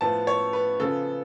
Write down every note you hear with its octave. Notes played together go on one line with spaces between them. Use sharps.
A2 F3 B3 A5
C#5
B4
C#3 F3 B3 A4